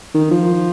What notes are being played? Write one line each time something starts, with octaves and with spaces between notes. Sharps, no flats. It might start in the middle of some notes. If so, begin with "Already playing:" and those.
D#3
F3